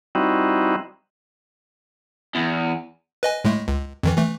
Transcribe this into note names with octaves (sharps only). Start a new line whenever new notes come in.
G3 C4 D#4 E4 F#4
E2
B4 D#5 G#5
A2 G#3 A3
C#2
F2 D#3 E3
E3 A3